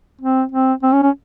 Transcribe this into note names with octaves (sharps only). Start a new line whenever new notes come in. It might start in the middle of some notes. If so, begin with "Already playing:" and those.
C4
C4
C4
C#4
C#4